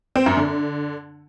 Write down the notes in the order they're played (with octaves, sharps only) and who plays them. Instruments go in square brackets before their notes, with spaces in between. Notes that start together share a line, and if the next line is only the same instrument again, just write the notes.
[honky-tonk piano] C4
F#2
D3